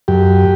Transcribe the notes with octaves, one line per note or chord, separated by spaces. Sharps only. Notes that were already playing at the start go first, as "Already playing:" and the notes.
F#2 G4